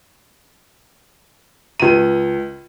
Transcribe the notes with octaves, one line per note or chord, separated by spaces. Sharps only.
C#2 D#7